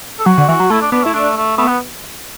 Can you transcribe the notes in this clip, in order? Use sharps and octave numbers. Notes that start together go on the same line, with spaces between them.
A4
F#3 F#4
D3
E3 F#4
F#3
A3 E4
D4
B3 D4
A3 E4
A3 D4
A3
A3 B3
B3